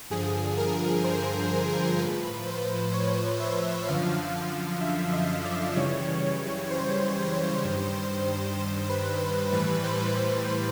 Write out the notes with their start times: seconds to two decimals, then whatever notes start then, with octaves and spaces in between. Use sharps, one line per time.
0.10 G2 D3 F3 G#4
0.57 A#4
1.04 C5
1.99 A2 F3 B4
2.47 C5
2.93 C#5
3.40 E5
3.87 F#2 D3 F3 F5
4.34 F5
4.81 E5
5.13 D#5
5.45 D5
5.76 F#2 C#3 E3 G3 C#5
6.71 C5
7.64 G2 D#3 G3
8.58 C5
8.90 B4
9.52 A2 E3 G3 B4
9.84 C5
10.15 B4